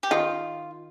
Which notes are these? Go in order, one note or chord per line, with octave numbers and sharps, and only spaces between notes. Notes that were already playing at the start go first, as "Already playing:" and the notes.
G4
D#3 F4